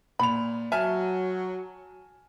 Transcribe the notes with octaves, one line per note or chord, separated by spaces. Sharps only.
A#2 B5 F7
F#3 E5 G#5 A5 F6